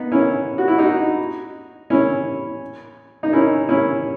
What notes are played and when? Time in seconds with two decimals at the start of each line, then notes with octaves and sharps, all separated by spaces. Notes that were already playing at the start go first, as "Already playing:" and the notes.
Already playing: B3 D#4
0.12 C#4 E4
0.58 F#4
0.68 E4
0.78 D#4 F#4
1.90 C#4 E4
3.23 D#4
3.33 C#4 E4
3.69 C#4 E4